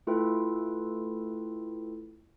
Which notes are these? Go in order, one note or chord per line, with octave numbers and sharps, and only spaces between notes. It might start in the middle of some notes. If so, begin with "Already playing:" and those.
A3 E4 F4 A4 B4 G5